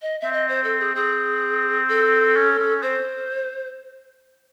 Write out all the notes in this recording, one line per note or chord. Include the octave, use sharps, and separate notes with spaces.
D#5
C4 E5
D#5
C5
A4
G#4
C4 G#4
A4
C#4
C#4
C4 C5